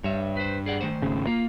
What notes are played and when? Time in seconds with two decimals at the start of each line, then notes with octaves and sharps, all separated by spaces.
0.04 G2 C#5 E5
0.37 B4 C5
0.66 G#4 D5 F#5
0.81 D#3 A3 C5
1.02 G#1 C#3
1.27 A#3 F4